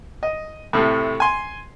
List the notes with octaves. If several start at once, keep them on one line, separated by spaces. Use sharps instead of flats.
D#5
A2 C3 A3
G#5 C6